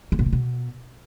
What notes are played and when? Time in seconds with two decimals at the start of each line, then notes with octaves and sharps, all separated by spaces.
0.12 G#2
0.19 B2
0.26 A#2
0.33 B2